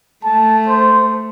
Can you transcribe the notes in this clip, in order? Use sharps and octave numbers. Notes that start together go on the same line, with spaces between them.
A3 A5
C5